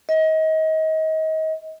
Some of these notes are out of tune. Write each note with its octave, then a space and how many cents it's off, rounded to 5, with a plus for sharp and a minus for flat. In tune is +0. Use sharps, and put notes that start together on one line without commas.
D#5 +30